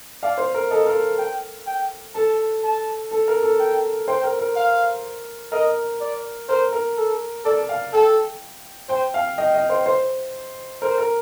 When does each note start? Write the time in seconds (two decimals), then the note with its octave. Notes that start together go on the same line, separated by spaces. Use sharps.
0.23 D5 F5
0.38 C5
0.55 A#4
0.70 A4 D#5
0.86 A#4
1.18 G5
1.66 G5
2.15 A4 A5
2.63 A5
3.11 A4
3.28 A#4
3.43 A4
3.59 G5
4.08 C5 G5
4.24 A#4
4.39 A#4
4.56 F5
5.52 A#4 D#5
6.00 D5
6.49 A#4 C5
6.73 A#4
6.97 A4
7.44 A4 D5
7.69 F5
7.93 A4 G5
8.89 C5 G5
9.14 F5
9.37 D#5 G5
9.54 D#5
9.70 C5
9.86 C5
10.82 A#4 C5
10.98 A#4